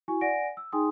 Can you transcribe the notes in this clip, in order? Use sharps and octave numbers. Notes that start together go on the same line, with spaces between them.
E4 F#4 G#5 C#6
D5 F#5 G#5 A#6 D7
E6
D#4 G#4 G5 G#5 C6 D#6